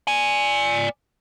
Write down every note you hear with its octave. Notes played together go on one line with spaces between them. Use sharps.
D5 G#5